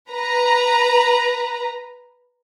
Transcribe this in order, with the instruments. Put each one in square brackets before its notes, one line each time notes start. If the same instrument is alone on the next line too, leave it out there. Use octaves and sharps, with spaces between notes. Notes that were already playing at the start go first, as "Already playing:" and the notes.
[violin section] B4 A#5